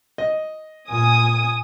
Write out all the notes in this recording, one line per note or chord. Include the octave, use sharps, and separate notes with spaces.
D#5
A#2 G#5 D#6